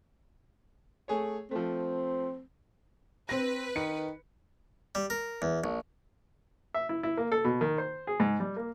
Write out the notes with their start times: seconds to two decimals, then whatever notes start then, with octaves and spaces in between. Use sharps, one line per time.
1.08 A3 G#4 C#5
1.51 F3 A3 C4
3.29 C4 B4 A#6
3.76 D#3 C#7
4.95 G3
5.10 A#4
5.42 E2
5.64 A#1
6.74 E5
6.89 E4
7.03 E4
7.17 A#3
7.32 A4
7.45 B2
7.61 D#3
7.78 C5
8.07 G#4
8.20 G#2
8.40 G3
8.57 A#3